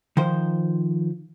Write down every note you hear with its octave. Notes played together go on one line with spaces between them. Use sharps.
D#3 F3 C5